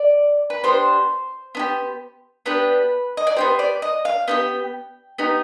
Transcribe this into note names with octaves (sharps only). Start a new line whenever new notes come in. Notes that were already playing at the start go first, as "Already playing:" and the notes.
Already playing: D5
B4
B3 D4 G4 C5
B3 D4 G4
B3 D4 G4 B4
D#5
D5
B3 D#4 G4 C5
D5
D#5
F5
B3 D#4 G4 G5
B3 D#4 G4